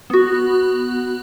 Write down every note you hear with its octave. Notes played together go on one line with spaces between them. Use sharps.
B3 F#4